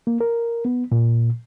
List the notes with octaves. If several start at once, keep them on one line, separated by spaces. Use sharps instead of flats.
A#3
A#4
B3
A#2